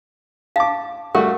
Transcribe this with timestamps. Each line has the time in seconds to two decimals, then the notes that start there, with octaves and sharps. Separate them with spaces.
0.56 F5 A5 D6
1.15 G3 A3 F#4 A#4